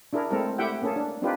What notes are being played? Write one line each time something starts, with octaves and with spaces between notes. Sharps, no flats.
D4 E4 G#4 A#4
G#3 A3 C4 E4 A4 A#4
A3 E4 G4 E5 F#5 G5
A#3 C#4 G#4 A4
D4
C4 D4 D#4 F4 G4 B4